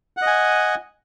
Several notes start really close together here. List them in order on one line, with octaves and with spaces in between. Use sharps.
F#5 D#5 G#5